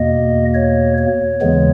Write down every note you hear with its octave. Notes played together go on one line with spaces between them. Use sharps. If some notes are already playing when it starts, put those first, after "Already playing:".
Already playing: E2 B2 A#3 D#5
C#5
C#5
D#2 C#3 E3 G#3 B3